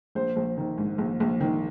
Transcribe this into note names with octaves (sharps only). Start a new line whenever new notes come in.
A#1 C5
A#1
D#3
G#2
A#1
A#1
D#3